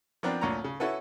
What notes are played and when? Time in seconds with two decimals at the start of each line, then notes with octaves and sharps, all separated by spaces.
0.23 F3 B3 C4 D4 A#4
0.41 D2 A#2 C#4 A#5
0.64 C#3
0.80 C#4 E4 F#4 A4 B4